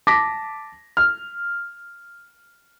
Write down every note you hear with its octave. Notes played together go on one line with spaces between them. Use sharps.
A5 D6 A#6 B6
F6